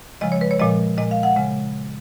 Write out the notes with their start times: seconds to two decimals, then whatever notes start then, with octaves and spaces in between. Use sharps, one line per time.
0.21 C#3 F3 G#3 D#5
0.32 C#5
0.41 B4
0.51 C#5
0.59 A#2 F3 G#3 D#5
0.97 A#2 G#3 D#5
1.11 F5
1.23 F#5
1.36 C#3 G#3